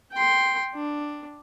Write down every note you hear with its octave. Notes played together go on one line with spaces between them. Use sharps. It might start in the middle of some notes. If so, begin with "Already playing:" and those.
G5 C6
D4